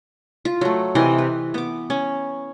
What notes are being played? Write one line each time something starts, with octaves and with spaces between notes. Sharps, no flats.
F4
F#3 A3
C3 E3 D#5 C6
B4
B3 D6
C#4